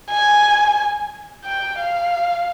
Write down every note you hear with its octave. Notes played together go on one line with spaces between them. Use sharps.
G#5
G5
F5